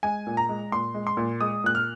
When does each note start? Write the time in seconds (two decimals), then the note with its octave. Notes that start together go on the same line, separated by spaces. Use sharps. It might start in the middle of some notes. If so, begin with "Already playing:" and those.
0.03 G#3 G#5
0.27 A#2
0.37 A#5
0.49 G#3
0.72 A#2 C6
0.94 G#3
1.07 C6
1.17 A#2
1.41 G#3 D#6
1.64 A#2 F#6
1.75 F6